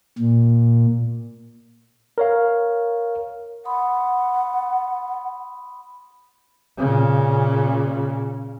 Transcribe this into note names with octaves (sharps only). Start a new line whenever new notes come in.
A#2
A#4 C#5 F5
F#5 B5 C6 D#6
A#2 C#3